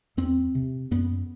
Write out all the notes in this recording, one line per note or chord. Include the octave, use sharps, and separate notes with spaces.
E2 C4
C3
F#2 B3